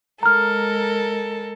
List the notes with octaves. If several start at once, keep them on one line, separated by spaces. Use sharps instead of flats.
G#3 A4 A#4 A#5 F6